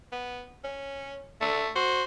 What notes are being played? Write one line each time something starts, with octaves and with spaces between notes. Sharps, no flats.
B3
C#4
D3 A3
F#4 C5